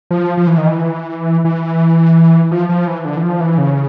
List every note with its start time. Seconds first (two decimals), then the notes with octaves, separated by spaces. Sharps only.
0.11 F3
0.37 F3
0.47 E3
0.58 D#3
0.68 E3
1.45 E3
2.51 F3
2.69 F3
2.87 E3
3.05 D3
3.17 E3
3.23 F3
3.40 E3
3.58 C#3